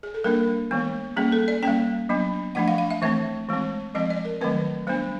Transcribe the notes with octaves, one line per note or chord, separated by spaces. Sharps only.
G#4
A4
G3 A#3 D4 A#4
E3 G#3 B3
G3 A#3 C#4 G#4
A4
D5
G3 A#3 C#4 G5
F#3 B3 D4
F3 A3 D4 F#5
F5
F5
E5
E3 A3 C4 E5
E3 G#3 C4
F3 G#3 C4 D#5
D5
A#4
D#3 F#3 A3 C4 B4
G3 B3 D4 C5